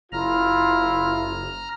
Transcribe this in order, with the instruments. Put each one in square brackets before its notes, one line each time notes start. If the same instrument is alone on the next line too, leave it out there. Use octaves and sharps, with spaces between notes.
[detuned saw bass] F#1 [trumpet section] E4 F4 [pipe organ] A#5 F6